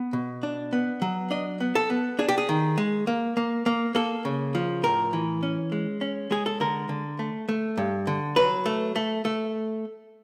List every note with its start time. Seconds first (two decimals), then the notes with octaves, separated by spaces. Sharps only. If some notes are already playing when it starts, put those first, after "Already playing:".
Already playing: B3
0.13 B2
0.43 D4
0.73 B3
1.02 F#3
1.31 D4 D#5
1.60 B3
1.75 A4
1.90 B3
2.19 D4 G#4
2.29 G4
2.38 G#4
2.49 D#3
2.78 G#3
3.07 A#3
3.37 A#3
3.66 A#3
3.95 A#3 A4
4.25 C#3
4.55 F3
4.83 A2 A#4
5.13 E3
5.43 C#4
5.72 G#3
6.01 C#4
6.31 G#3 G#4
6.46 A4
6.60 D3 A#4
6.89 D3
7.19 A3
7.49 A3
7.77 G2
8.07 D3
8.36 F#3 B4
8.66 A3
8.96 A3
9.25 A3